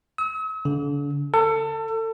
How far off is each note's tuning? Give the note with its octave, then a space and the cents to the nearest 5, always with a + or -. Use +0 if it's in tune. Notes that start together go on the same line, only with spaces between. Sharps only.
E6 -45
D3 -40
A4 +30